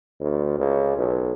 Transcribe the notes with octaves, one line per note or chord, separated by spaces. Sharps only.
D2
C#2
B1